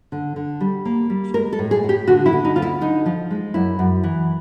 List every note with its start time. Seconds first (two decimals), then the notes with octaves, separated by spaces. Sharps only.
0.12 D3
0.36 D3
0.60 G3
0.85 A#3
1.10 G3
1.34 G#3 A#4
1.53 A4
1.59 A2
1.71 G#4
1.83 A2
1.89 G4
2.08 D3 F#4
2.26 E4
2.33 D3
2.45 D#4
2.56 D2 F4
2.62 E4
2.81 D3 D#4
3.06 F3
3.31 G#3
3.54 F#2 E4
3.79 F#2
4.04 E3